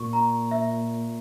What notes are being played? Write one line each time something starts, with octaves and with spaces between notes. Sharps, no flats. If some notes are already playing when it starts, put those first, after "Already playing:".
Already playing: A#2 C#6
A#5
E5